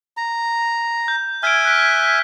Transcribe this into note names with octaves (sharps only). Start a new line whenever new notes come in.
A#5
G6
E5 G#5 F6 G#6 D7
F#6 B6 D7